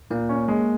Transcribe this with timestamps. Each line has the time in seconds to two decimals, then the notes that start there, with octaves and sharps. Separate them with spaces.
0.10 A#2 A#3
0.29 C#4
0.48 G#3